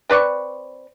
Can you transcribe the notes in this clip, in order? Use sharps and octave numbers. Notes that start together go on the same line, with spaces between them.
C4 B4 D5 C#6